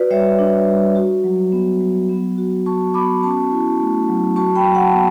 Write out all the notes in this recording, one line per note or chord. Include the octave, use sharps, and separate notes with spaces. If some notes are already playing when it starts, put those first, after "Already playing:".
Already playing: F#4 B4 D5
G3 C#5 E5
D4
G3
F#4
F#3
B3
F#3
B3
F#4
F#4 A5 C#6
B3 B5 D6
C#4 A5 C#6
E4
A3
F#3
F#4 A5 C#6
G5 B5
F#3
F#5 A5
B3